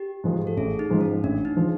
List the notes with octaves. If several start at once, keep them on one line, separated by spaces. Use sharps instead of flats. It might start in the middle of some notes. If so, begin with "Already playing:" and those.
Already playing: G4
G#2 F3 G#3
A4
A1 G#4
D#4
G#2 F3 G#3
C#4
A1 D4
D#4
F3 G#3